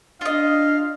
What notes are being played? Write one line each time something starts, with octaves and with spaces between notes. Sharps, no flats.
D4 F4 D#5 F5